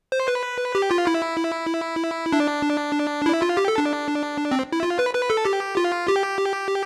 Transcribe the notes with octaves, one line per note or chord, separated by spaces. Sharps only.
C5
B4
G4
F4
E4
D4
E4
F4
G4
A4
D4
C4
E4
F4
B4
B4
A4
G4
F4
G4